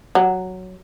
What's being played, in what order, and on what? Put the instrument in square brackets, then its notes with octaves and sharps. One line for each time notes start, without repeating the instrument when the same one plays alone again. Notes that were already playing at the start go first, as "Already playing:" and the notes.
[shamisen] F#3